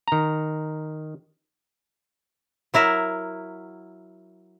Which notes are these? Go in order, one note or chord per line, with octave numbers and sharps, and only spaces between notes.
D#3 A#5
F#3 E4 A#4 E5